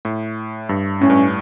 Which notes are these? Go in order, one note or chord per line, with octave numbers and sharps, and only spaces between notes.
A2
G2
A2 C#4
G2